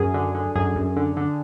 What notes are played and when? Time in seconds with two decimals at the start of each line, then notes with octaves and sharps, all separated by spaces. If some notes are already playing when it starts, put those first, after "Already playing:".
Already playing: F#2 G#4
0.14 D3
0.35 D3
0.55 F#2 G#4
0.76 F#2
0.96 D3
1.17 D3